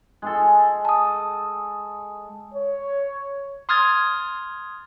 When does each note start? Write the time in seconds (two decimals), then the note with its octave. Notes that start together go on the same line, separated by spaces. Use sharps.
0.22 G#3 G#4 A4
0.85 A5 D#6
2.54 C#5
3.69 C6 D#6 F6 G#6 A6